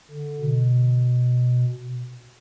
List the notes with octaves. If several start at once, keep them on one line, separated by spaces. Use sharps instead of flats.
D3
B2